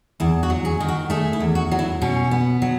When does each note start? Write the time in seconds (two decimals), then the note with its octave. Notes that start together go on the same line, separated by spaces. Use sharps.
0.20 E2 E4
0.43 F#4
0.50 F#3
0.65 G#4
0.80 D#3
0.88 F#4
1.10 A3 G#4
1.33 E4
1.40 E2
1.55 F#4
1.71 F#3
1.79 E4
2.02 B2 C#4
2.31 B3
2.62 F#3